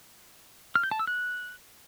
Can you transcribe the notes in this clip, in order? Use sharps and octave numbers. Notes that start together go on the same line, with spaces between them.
F6
G6
A5
E6
F#6